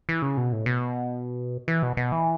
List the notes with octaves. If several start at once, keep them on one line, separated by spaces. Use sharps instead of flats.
E3
C#3
B2
A2
B2
E3
B2
B2
E3